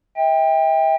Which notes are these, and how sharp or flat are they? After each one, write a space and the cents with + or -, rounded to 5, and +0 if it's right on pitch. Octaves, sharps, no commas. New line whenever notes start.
E5 -40 G5 +20